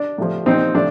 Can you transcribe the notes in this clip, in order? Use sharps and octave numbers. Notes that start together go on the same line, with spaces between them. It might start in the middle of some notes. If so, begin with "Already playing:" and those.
Already playing: D4
A2 F3
A#2 F3 C4 D#4
A2 F3 D4